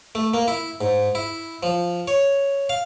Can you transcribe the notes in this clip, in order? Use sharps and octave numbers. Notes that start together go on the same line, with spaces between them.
A3
A#3
E4
G#2
E4
F3
C#5
F5